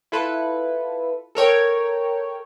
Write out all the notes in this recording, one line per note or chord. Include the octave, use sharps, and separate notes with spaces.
E4 F4 A4 B4
A4 A#4 C#5 G5